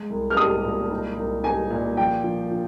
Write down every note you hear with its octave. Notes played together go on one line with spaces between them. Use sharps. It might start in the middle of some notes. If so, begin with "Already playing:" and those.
Already playing: G#3
C2
F6
C2 D#6
A#2
D#4
C2
D#4 G#5
A#2
F3 G5
F3
F3